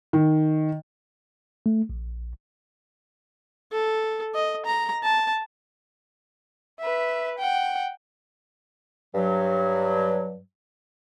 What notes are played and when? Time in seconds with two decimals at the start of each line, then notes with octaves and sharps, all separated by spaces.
0.13 D#3
1.66 A3
1.89 A#1
3.72 A4
4.35 D#5
4.65 A#5
5.04 A5
6.80 B4 E5
7.39 F#5 G5
9.15 G2 F#3